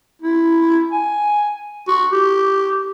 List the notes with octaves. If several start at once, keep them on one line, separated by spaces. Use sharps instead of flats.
E4
G#5
F#4
G4